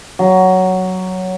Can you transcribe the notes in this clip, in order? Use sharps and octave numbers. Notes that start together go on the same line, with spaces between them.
F#3